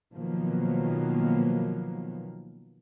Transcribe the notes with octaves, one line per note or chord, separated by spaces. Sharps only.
B2 D#3 F3 F#3 A#3 B3